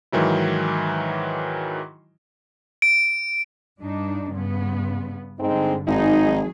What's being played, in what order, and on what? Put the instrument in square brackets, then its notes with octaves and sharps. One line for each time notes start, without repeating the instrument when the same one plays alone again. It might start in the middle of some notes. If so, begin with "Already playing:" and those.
[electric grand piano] G#2 D#3 E3 F#3 E4
[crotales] D7
[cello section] G2 D4 D#4
G2 C#3 B3
[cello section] G2 D3 [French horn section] G#3 C4 D#4
[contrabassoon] G#1 [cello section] F#3 G#4 [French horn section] D#4